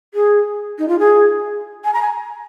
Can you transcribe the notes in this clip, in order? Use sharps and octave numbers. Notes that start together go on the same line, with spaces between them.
G#4
D#4
F4
G#4
G#5
A#5
G#5